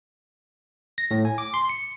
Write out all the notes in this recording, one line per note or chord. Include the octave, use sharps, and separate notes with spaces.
A#6
A2
G#5
D6
C6
C#7